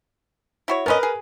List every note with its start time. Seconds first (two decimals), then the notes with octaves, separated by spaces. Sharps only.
0.68 E4 F#4 C#5
0.86 B3 C#4 A#4 B4 D#5
1.03 G#4